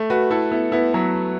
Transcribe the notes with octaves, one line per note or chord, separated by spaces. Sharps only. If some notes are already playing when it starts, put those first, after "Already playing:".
Already playing: A3
F#4 B4
E4 A4
B3 E4
B3 E4
F#3 B3